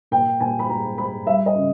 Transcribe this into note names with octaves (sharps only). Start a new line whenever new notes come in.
A#2 G5
A#2 G#5
B5
G#3 A#5
G#3 B5
G3 E5
D#5
C#3